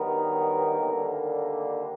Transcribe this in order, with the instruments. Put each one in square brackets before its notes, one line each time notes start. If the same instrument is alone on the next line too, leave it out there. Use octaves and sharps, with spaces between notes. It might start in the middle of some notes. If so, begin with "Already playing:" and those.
Already playing: [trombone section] G2 D#3 F#3 B3 A#4
D#2 D3 G3 A#3